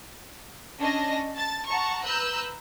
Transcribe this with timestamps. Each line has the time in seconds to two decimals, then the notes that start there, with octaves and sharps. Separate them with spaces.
0.78 C#4 D4 D#5 A#6
1.34 A5 A6
1.67 F#5 A5 A#5 C#6
2.04 B4 A#5 E6 F#6 G6